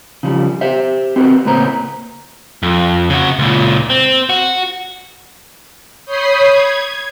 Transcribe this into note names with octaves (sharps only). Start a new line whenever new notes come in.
C#3 F3 G3
G4 C5 E5
C4 F#4 G4 A#4 B4
A2 C#3 A#3 B4 C5 A#5
F2
C#3 F#4
C#2 A#2
C4
F#4
C#5 B5 D#6 G6 C7
G#6